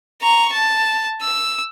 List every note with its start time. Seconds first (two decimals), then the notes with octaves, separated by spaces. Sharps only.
0.22 A#5 C#6
0.53 A5
1.21 E6